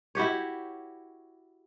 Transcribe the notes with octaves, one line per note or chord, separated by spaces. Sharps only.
E4 F#4 G4 C#5